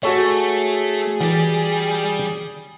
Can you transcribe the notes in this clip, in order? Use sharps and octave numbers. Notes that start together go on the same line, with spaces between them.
A3 F#4 G#4 A4 C#5
E3 G3 G4